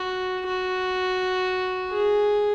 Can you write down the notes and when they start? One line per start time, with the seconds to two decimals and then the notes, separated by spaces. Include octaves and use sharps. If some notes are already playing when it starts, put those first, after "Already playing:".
Already playing: F#4
0.47 F#4
1.92 G#4